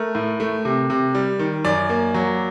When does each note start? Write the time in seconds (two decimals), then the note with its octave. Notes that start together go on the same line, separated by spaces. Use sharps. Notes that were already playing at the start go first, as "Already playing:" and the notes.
Already playing: A3 A#4
0.15 A2
0.40 A3
0.65 C3
0.90 C3
1.15 G3
1.39 D#3
1.65 F#2 D5
1.89 A#3
2.14 F#3